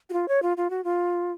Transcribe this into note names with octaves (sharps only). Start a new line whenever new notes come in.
F#4
F4
C#5
F4
F4
F#4
F4